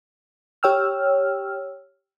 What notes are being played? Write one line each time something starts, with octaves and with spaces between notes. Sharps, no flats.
G4 C#5 G5 E6 F6